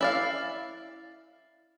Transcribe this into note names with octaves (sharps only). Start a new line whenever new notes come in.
E4 D5 F5